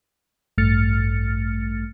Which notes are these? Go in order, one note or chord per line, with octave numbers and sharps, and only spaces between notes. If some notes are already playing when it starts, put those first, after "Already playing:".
A1 G2 A3 F6 A6 C#7